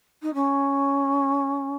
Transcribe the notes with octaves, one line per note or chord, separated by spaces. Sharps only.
D#4
C#4